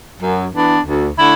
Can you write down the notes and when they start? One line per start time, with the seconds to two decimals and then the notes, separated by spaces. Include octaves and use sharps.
0.21 F#2
0.52 E3 B3 D4
0.84 D2
1.17 D3 A3 E4